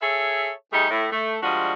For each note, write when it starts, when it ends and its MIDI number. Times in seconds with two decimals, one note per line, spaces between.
0.01 0.50 68
0.01 0.50 69
0.01 0.50 73
0.01 0.50 76
0.73 0.89 55
0.73 0.89 57
0.73 0.89 63
0.73 0.89 68
0.90 1.07 45
1.12 1.38 57
1.43 1.74 53
1.43 1.74 55
1.43 1.74 56
1.43 1.74 62
1.43 1.74 66